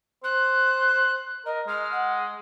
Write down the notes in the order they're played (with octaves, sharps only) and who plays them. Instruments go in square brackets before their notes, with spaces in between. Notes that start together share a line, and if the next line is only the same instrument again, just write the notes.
[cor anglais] C5 [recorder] F#6
[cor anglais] A#4 [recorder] D#5
[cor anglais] G#3 [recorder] F6
[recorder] F#5